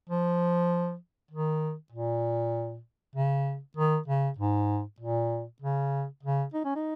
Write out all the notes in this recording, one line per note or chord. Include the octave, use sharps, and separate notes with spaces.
F3
D#3
A#2
C#3
D#3
C#3
G#2
A#2
C#3
C#3
D#4
C#4
D#4